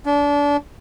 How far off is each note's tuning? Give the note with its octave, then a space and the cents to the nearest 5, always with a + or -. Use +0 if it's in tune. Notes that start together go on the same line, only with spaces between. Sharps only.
D4 -30